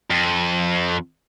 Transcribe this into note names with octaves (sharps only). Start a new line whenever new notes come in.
F2